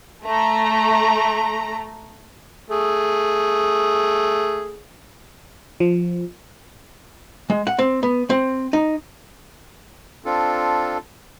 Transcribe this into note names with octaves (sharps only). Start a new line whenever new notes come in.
A3 A#5
A3 G#4
F3
G#3
F#5
C4
B3
C4
D#4
C4 D4 F4 A4